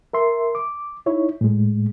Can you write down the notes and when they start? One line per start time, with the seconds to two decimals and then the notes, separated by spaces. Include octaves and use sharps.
0.13 A#4 E5 C6
0.55 D6
1.06 D#4 E4 C#5
1.41 A2 G#3